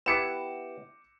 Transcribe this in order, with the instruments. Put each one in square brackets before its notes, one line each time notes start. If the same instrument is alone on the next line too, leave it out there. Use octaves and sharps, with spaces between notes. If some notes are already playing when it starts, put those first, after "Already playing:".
[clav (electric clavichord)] B3 E4 G4 [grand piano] D6 C#7 E7